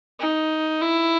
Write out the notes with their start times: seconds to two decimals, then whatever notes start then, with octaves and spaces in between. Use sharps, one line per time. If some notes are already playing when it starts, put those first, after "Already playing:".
0.20 D#4
0.81 E4